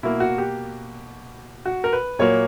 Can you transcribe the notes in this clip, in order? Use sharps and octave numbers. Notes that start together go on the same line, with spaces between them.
B2 A#3 E4
F#4
G4
F#4
A#4
B4
A#2 F#3 A#3 C#5